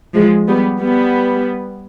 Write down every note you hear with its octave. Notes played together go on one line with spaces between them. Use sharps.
F3 G#3
G3 B3
G3 B3